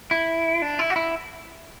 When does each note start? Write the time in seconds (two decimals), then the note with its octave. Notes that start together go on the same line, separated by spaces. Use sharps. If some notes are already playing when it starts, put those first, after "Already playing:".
0.11 E4
0.62 D4
0.79 E4
0.90 F#4
0.96 E4